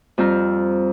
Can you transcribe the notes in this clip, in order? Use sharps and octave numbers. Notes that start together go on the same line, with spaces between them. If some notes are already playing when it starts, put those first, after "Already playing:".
F2 G3 C4 F4 A#5 F6